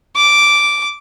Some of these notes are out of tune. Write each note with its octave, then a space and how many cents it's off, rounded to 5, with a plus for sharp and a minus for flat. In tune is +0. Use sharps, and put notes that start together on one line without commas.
D6 -5